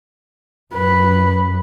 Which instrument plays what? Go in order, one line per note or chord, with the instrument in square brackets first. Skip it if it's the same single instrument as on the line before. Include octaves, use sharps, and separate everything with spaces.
[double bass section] F#2 [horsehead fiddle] B4